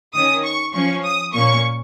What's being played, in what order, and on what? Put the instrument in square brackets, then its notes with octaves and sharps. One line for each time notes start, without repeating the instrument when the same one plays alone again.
[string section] D#3 C#4 D#6
C#6
F3 C#4 C#6
D#6
A#2 A#3 C#4 C#6